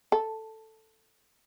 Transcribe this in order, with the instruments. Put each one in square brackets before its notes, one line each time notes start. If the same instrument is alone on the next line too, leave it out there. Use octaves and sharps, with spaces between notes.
[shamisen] A4